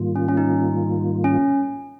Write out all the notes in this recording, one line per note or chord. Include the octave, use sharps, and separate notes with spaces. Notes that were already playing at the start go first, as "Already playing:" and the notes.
Already playing: G#2 D#3 G3 A#3 F4
C#4
C#4
D#4
C#4